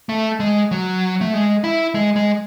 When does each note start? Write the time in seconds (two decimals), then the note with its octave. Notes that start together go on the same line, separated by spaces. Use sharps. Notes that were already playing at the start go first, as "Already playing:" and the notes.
0.09 A3
0.40 G#3
0.71 F#3
1.21 A3
1.34 G#3
1.64 E4
1.95 G#3
2.16 G#3